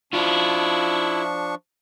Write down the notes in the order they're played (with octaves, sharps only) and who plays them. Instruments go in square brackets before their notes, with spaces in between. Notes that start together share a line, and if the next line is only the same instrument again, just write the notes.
[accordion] F3 D4 C#6 [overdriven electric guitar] E4 F4